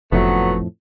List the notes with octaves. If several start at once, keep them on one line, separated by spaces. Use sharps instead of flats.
F#1 F2 A2 F3 F#3 A3 B3